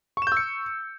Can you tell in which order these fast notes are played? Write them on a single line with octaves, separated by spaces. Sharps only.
C#6 E7 G6 E6 C#7